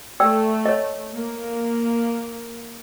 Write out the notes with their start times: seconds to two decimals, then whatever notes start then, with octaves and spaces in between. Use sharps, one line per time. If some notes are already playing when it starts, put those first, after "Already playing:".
0.20 A3 D5 G5 E6
0.66 C#5 D#5
1.15 A#3